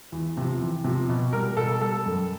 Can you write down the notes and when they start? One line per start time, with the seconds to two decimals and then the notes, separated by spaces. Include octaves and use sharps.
0.12 E2
0.37 C3 F3
0.61 E2
0.84 C3 F3
1.09 B2
1.33 G3 A#4
1.57 B2 A4
1.81 G3 A4
2.06 F#2